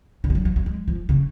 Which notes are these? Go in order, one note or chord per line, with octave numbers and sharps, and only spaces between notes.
D3
G#3
F#3
F#3
F#3
G#3
F3
C#3